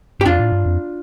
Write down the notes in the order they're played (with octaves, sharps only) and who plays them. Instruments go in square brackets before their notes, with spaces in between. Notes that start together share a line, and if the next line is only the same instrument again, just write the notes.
[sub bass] G2 [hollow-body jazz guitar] G4
[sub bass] F2 [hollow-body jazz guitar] D4 F4
[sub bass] A2
G2
F2